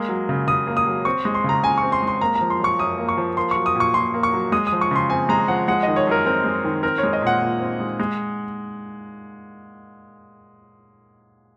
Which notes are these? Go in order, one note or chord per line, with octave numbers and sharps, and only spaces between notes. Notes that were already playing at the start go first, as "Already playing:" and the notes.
Already playing: G#3 A#3
F#3
C#3
C#3 D#6
A#3
D#6
F#3
C4 C#6
G#3
C6
C#3 A#5
C#3 G#5
C4 C#6
C6
G#3 C6
A#3 A#5
A#5
F3
C6
F#2 C#6
F#2 D#6
A#3
C#6
F3
A#3 C6
F#3 C#6
D#6
A#2 C#6
A#2 C6
A#3
C#6
F#3
G#3 D#6
D#6
F3
C#6
C#3 C6
C4 G#5
G#3 A#5
F3 F#5
G#3 F#5
D#3 D#5
C#5
F#2 A#4
C4 A#4
G#3
D#3
C4 A#4
C#5
G#3
D#5
A#2 F#5
A#2
C4
G#3
G#3